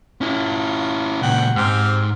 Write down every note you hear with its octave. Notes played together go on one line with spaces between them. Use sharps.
C#4 E4 F4
A#2 C#3 F#5 G5
G#2 C4 G4 F6